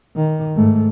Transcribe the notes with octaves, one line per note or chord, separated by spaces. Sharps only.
D#3
G#2 A3